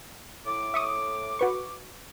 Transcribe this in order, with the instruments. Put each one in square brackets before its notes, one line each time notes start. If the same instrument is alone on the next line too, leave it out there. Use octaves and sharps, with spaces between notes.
[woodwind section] A2 D6
[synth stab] E5 C#6 D#6
F#4 B4 C#6